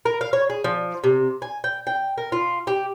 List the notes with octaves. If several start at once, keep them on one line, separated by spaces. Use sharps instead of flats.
A#4
F5
C#5
G#4
F3
C3
G#5
G5
G5
A#4
F4
G4